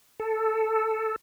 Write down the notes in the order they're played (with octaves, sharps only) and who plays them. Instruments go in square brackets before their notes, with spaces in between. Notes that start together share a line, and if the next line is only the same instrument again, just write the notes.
[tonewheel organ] A4